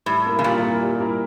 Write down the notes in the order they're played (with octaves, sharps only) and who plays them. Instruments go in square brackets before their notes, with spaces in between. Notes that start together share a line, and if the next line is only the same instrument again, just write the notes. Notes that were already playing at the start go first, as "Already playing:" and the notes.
[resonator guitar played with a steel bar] A2 [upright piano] G3
[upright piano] A#3 E4 A#4
[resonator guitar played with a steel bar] C#3
[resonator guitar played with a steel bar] A#2 [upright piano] G3
[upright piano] A#3 E4 A#4
G3
A#3 E4 A#4